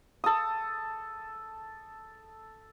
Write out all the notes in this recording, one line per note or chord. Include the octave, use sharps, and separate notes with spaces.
A4 D#6